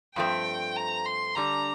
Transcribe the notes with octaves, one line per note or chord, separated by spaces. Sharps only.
G2 F3 A3 C4 G5
A#5
C6
D3 G3 D4 A#5